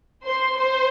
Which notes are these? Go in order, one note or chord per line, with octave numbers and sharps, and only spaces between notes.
C5 C6
C5 C6